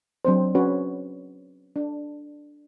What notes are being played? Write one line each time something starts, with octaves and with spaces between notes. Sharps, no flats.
F#3 C4 D4 C5
C#4 F#4 B4 C#5
D4